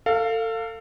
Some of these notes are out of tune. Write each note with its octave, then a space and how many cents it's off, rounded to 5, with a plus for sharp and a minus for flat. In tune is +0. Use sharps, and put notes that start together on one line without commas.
A4 +30 F5 +0